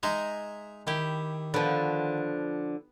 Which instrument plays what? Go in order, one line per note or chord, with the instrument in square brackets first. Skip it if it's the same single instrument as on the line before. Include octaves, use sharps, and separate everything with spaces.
[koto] G#3 D#4 [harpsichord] D#5 E5 A#5
[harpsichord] D#3 [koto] E4 G4
[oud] D3 F3 [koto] B3